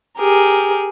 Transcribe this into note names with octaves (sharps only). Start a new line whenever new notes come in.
G4 G#4 A#4